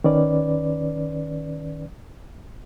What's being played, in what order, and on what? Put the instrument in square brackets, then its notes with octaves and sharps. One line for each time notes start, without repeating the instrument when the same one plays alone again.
[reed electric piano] D#3 C#4 B4 D5